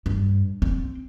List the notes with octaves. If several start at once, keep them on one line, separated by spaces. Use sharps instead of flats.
G2
C4